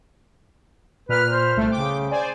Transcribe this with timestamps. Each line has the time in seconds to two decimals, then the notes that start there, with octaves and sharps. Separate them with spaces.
1.09 A#2 B4 F6
1.31 C5
1.56 C2 A3
1.71 C#3 G5 D6
2.11 C5 D5 G#5